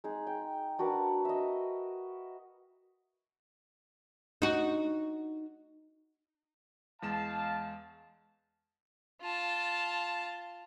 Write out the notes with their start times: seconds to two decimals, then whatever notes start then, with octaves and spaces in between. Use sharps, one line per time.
0.04 G#3 D#4 G#4
0.27 G5
0.79 D4 F#4 A#4 B4
1.25 D#5 E5
4.42 D#4 F#4
7.02 E2 G#3 F5 A5 E7
9.22 F4 A5